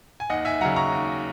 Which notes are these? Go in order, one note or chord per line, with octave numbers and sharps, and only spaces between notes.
G#5
D#2 D#5 F#5
E5 G#5
C#3 F#3 F#5 A#5
A#5 C#6
D#2